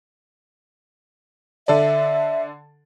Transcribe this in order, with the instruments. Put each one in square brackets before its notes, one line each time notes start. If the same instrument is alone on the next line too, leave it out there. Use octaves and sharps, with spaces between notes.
[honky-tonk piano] D3 A4 D5 [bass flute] E5